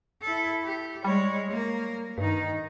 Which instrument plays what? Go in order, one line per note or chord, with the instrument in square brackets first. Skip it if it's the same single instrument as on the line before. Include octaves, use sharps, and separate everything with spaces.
[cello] E4 A4
G4
[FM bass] G3 [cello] G#3 C#5
[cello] A#3 A#4
[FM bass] G2 [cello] D#3 D#4